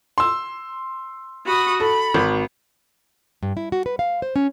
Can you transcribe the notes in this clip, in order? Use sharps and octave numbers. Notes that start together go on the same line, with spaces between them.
C6 E6
F#4 B5 D#6
A4 B5
G#1
G2
E4
F#4
B4
F5
C5
C#4